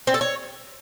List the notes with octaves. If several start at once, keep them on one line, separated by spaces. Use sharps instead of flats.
C4
A4
C#5